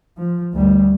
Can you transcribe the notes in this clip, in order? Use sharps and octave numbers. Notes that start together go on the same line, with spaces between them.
F3
D2 G3